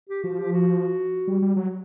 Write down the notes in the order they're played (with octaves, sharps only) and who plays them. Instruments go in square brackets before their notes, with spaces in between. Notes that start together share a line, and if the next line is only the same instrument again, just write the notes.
[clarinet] G4
[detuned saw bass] F3 [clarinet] F#4
[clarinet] G4
F#4
[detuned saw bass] G3
G3
F#3